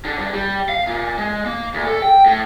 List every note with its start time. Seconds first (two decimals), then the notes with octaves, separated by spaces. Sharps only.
0.05 D3
0.18 G2
0.33 G3
0.69 F5
0.87 A#2
1.18 G#3
1.46 A#3
1.74 D2
1.86 A4
2.02 G5
2.26 A2